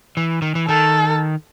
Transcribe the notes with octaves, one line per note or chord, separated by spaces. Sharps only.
E3
D#3
E3
D#3 A4